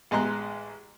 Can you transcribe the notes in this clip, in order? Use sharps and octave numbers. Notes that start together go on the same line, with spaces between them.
A1 G#3 A#5 C6 F#6